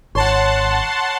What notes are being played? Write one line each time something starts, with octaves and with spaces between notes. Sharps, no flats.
G#1 C#5 F#5 A5 C6